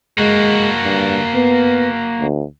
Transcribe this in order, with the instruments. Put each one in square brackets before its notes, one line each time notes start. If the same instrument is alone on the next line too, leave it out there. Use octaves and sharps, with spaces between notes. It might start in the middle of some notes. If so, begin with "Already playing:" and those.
[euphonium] G#3 [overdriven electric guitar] A#3 F#4
[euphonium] G2
B3
D2